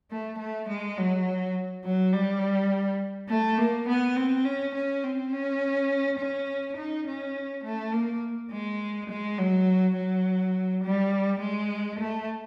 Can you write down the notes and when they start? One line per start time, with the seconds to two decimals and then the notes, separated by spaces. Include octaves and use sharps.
0.11 A3
0.39 A3
0.69 G#3
0.98 F#3
1.85 F#3
2.13 G3
3.29 A3
3.58 A#3
3.88 B3
4.16 C4
4.45 C#4
4.75 C#4
5.04 C4
5.33 C#4
6.19 C#4
6.77 D#4
7.07 C#4
7.64 A3
7.93 A#3
8.51 G#3
9.10 G#3
9.38 F#3
9.96 F#3
10.84 G3
11.41 G#3
11.99 A3